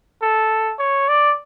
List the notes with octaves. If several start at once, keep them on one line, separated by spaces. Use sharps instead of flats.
A4
C#5
D5